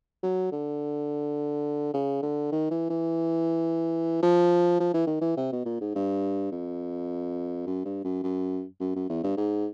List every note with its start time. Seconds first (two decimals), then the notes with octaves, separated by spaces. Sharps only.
0.23 F#3
0.52 D3
1.94 C#3
2.22 D3
2.52 D#3
2.71 E3
2.90 E3
4.23 F3
4.80 F3
4.94 E3
5.07 D#3
5.21 E3
5.37 C3
5.52 B2
5.65 A#2
5.81 G#2
5.95 G2
6.52 F2
7.67 F#2
7.85 G2
8.04 F#2
8.23 F#2
8.80 F#2
8.95 F#2
9.09 E2
9.23 G2
9.37 G#2